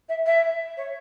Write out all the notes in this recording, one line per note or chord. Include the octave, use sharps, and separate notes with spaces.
E5
E5
C#5